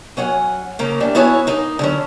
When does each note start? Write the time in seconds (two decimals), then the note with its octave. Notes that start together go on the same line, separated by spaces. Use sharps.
0.17 F#3 C#4 F#5 G#5
0.79 C#3 A#3 C#4 A#4
1.00 E3 G3 A#3 D4
1.15 B3 E4 F#4 C#5 F#5 G#5
1.47 A#3 D#4 D#5
1.79 D3 F#3 C#4